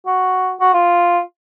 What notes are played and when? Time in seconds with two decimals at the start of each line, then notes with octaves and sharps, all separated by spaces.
0.07 F#4
0.60 F#4
0.74 F4